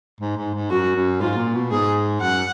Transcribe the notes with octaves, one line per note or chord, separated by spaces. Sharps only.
G#2
G#2
G#2
F#2 F#4
F#2
G#2 F4
A#2
B2
G#2 G#4
F#2 F#5